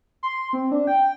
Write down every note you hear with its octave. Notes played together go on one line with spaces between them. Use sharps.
C6
C4
D4
G5